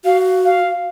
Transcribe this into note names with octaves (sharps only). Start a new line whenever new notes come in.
F#4 F5
F5